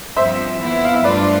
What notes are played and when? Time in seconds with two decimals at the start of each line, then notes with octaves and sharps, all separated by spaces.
0.16 G2 F3 C4 C5 E5
0.60 F2 E3 B3 E4
0.84 F5
0.94 E5
1.04 G2 F3 A3 D4 F4 B4 D5